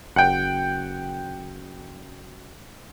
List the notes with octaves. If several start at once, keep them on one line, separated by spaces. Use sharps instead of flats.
F#1 F#5 G5